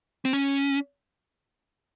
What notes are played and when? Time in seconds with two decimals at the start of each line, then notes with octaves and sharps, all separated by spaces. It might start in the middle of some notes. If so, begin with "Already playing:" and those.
0.25 C4
0.33 C#4